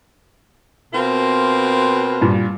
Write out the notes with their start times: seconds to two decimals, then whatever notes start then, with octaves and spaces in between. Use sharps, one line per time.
0.93 B2 C4 F4 A#4
2.21 G2 A#2